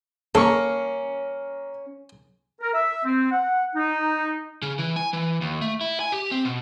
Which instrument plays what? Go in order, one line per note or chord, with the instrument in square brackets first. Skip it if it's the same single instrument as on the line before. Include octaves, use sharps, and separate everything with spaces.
[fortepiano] A#3 A#4 C#6 [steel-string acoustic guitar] C#4 [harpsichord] A4
[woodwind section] A#4
E5
C4
F#5
D#4
[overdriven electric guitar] C#3
E3
G#5
E3
D#2
A3
E4
G#5
G4
C4
B2